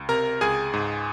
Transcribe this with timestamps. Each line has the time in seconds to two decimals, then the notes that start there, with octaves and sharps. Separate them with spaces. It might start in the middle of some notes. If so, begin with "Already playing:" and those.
Already playing: C#2
0.09 C3 A#4 A#5
0.41 C#2 G#4 G#5
0.73 G#2